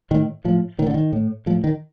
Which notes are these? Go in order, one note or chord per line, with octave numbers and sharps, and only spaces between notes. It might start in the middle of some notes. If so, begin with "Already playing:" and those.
A2 D#3
A2 F3
A2 D#3
D3
D#3
A2
A2 F3
D#3